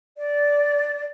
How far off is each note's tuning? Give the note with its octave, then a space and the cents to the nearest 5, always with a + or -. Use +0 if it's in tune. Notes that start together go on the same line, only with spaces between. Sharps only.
D5 -10